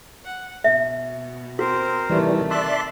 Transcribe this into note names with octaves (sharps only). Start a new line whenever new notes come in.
F#5
B2 E5
C4 F#4 A#4 C5
C3 D#3 E3 G3 A3
D5 E5 A5 C6 E6 F#6